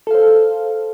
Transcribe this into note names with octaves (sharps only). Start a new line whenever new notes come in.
A4 C5 F5